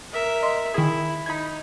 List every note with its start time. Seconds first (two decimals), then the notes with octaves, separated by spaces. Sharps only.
0.11 A#4 E5
0.42 D#5 C6
0.74 D#3 E4 G#4
1.26 D#4 B5 G#6